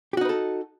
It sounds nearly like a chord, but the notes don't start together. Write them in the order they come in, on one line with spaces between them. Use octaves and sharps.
G4 F#4 D#4 B4 A4